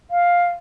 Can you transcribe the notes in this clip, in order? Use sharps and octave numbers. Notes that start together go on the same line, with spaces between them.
F5